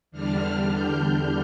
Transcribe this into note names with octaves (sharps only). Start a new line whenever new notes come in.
E2 D3 G3 D4 F6
G6
F6